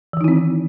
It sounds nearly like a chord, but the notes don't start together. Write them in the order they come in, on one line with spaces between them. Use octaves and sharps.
E3 D#3 D#4 E4 C4